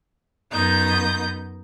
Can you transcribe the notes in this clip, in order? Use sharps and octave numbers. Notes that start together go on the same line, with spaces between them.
F#2 B3 D#4 D#5 G6